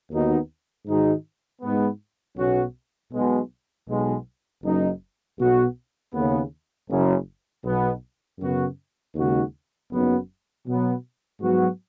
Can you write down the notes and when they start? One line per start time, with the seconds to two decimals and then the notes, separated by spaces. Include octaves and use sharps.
0.11 D#2 D#3 B3 D#4 F#4
0.86 G#2 D#3 G#3 D#4 F#4
1.62 G#2 G#3 B3
2.37 B1 B2 F#3 C#4 F#4
3.12 B1 B2 G#3
3.88 B1 B2 G#3
4.64 F#1 F#2 F#3 D#4
5.38 B1 B2 B3 F#4
6.13 D#2 C#3 B3
6.89 F#1 F#2 C#3
7.64 B1 B2 B3
8.39 F#2 C#3 B3 F#4
9.15 D#2 C#3 G#3 D#4 F#4
9.90 F#1 F#2 F#3 B3 D#4
10.66 B2 F#3 B3
11.41 G#2 F#3 B3 F#4